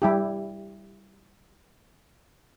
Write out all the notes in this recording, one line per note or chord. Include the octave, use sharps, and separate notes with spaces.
G3 E4 G4